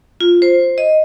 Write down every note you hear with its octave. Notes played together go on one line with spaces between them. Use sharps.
F4
C5
D#5